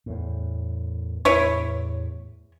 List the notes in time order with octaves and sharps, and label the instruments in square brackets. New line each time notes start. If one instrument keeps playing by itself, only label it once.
[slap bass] E2 A2
[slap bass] E2 A2 [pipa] E4 B4 C#5